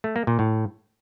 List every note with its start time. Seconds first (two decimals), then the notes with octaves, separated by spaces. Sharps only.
0.04 A3
0.16 A#3
0.27 A#2
0.39 A2